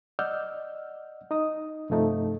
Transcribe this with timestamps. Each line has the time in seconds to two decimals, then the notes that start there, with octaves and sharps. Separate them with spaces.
0.19 D5 D#5 F#5 E6 F6 G6
1.31 D#4 D#5 D#6
1.90 G2 C3 F3 A3 D#4 A4